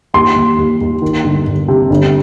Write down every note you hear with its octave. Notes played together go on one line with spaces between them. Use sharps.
D#2 C6
D#2
D#2
D#2
D#3
G1
G1
C3
G1